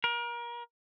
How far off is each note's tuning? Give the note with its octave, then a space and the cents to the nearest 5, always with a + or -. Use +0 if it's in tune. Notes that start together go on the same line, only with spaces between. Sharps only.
A#4 +30